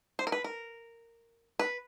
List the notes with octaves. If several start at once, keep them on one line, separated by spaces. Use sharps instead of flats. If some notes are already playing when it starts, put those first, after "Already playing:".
C5
A#4
B4
A#4
B4